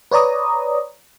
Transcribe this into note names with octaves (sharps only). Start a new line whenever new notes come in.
B4 C#5 D5 A#5 D#6